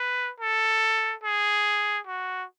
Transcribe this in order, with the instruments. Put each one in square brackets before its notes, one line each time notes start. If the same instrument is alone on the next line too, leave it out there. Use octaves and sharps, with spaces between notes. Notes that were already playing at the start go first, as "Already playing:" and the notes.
Already playing: [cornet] B4
A4
G#4
F#4